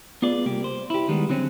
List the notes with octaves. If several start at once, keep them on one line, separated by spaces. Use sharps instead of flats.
B3 F4 G#4 D5
C2 A#3 G4
C5
E4 G4
D#3 G3 G#3 B3
D3 F#3 C4 C#4